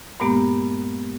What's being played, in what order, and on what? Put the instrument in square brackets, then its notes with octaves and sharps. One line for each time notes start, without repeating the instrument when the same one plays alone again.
[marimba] G2 A#2 G#3 A#3 B3 G4